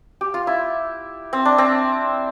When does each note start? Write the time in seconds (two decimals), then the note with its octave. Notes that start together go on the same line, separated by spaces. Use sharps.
0.21 G4
0.34 F4
0.47 E4
1.33 C4
1.45 D4
1.58 C4